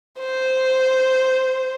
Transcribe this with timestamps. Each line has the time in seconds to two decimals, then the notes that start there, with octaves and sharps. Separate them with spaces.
0.19 C5